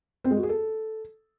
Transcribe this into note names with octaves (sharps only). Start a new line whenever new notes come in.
C4
G#3
F#4
G#4
A4